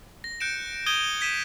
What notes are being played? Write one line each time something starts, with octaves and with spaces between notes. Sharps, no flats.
A#6
F#6 G6 C#7 D7 E7
D#6 G6 G#6 D#7 G7
G#6 B6 D#7 E7